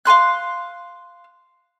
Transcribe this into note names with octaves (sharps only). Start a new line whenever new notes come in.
F5 G#5 C6 F#6